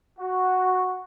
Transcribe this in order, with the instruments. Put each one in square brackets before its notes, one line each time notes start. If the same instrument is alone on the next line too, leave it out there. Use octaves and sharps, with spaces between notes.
[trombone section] F#4